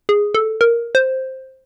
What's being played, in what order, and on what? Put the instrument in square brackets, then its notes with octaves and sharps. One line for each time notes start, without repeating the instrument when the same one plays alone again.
[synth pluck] G#4
A4
A#4
C5